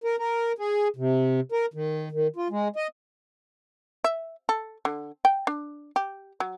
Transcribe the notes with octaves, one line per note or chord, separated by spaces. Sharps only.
A#4
A#4
G#4
C3
A#4
D#3
D#3
F4
G#3
D#5
E5
A4
D3
G5
D4
G4
F#3